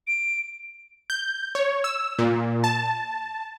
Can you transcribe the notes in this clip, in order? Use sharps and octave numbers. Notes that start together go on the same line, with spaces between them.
D7
G6
C#5
E6
A#2
A5